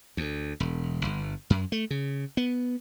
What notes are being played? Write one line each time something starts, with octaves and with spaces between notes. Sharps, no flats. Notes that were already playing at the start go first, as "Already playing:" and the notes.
D2
E1
G1
F#2
A3
C#3
B3